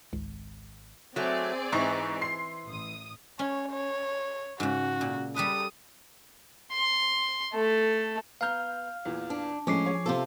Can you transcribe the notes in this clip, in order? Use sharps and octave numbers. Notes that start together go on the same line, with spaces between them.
G#1 C#2
F#3 A3 C4 G#4 D5
G#2 E3 D#4 C#6
C6 C7
A1 D#6
C#4 C#5
C#5
G#2 C#3 F#4
A#2
G3 A4 B4 D#6
C6
A3 A4
B3 F5 A#5 F6 G6
E2 A#2 E3
D4
A2 F3 G#3 C#4 D6 C7
G#4 C#5
C3 C4 F4 A4